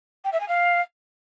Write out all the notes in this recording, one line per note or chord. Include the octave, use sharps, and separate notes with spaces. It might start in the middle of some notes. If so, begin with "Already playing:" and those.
G5
E5
G#5
F5